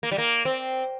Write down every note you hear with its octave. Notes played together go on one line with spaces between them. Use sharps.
A#3
G3
A#3
C4